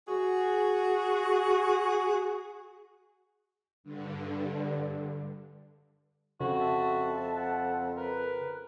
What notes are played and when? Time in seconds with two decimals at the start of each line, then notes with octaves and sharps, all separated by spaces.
0.08 F#4 G#4
3.84 G2 D3
6.40 F2 C#3 F#4
6.59 E5 A5
7.36 F#5
7.97 A#4 B4